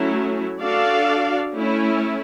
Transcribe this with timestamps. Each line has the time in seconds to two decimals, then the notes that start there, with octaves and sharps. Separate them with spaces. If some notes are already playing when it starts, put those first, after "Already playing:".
Already playing: F#3 A3 C#4 E4
0.60 D4 F#4 A4 D5 F5
1.53 A3 C#4 E4